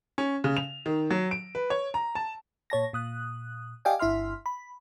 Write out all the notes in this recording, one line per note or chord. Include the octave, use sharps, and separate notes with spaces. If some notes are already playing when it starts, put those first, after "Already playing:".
C#4
C#3
F7
D#3
F#3
D7
B4
C#5
A#5
A5
A#2 C#5 A5 A#6
A#2 D#6 F#6
G4 D5 D#5 F5 G5 G#5
G1 E4 E5 C6 F6
B5